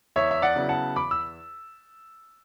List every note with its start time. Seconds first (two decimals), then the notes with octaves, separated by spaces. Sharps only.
0.16 E2 C#5 E5
0.31 E5
0.42 D5 F#5
0.56 C#3 F#3 B3 E4
0.69 F#5 A5
0.96 E2 B5 D6
1.11 E6